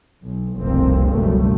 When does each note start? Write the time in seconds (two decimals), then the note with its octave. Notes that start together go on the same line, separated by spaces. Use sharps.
0.24 B1
0.59 F1 C2 G2 A#3 C4
1.08 C#2 G2 B2 F#3 G3 A3